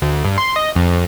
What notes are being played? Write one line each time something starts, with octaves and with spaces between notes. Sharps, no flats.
D2
G2
C6
D#5
F2